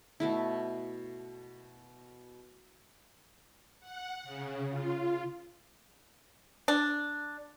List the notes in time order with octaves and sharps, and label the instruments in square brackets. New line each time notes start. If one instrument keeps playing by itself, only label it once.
[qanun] B2 A3 E4
[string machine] F#5
C#3
F4
[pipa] D4